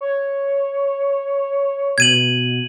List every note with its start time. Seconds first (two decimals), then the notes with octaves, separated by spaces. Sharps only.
0.01 C#5
1.98 B2 G#6 D#7 F#7